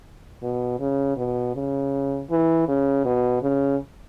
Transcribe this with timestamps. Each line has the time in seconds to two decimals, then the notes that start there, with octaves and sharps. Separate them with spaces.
0.43 B2
0.80 C#3
1.17 B2
1.55 C#3
2.30 E3
2.68 C#3
3.05 B2
3.43 C#3